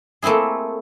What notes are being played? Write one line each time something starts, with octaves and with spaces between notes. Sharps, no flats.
A3 A#3 C4 E4 G#4